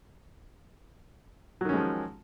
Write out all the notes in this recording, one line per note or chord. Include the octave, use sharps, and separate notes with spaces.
D#3 F3 F#3 G#3 C#4